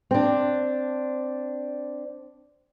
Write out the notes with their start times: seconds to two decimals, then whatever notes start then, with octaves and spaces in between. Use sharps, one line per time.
0.11 C4 D4